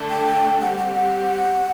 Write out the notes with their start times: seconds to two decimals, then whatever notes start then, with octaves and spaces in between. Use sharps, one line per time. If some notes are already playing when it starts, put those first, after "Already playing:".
Already playing: D3 A3 D4 A4
0.10 G5
0.61 G3 C4 G4 F#5
0.78 F#5
0.95 F#5